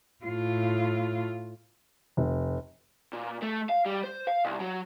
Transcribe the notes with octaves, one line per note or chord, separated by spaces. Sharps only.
A2 F4
F1
A#2
A3
F5
G3
C5
F5
C2
F#3